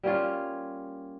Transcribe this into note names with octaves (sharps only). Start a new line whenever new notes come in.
G3 A#3 C#4 F4